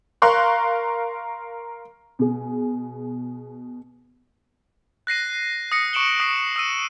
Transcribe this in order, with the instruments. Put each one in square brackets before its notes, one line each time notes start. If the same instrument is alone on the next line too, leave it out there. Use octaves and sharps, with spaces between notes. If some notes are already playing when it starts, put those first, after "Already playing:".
[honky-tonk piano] A#4 F5 C6 C#6 F#6
B2 G#4
[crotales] F#6 A#6 C7 D#7
D#6 A#6 C#7
C#6 D7 E7 F#7 G7
D#6 C7
D#6 E6 D#7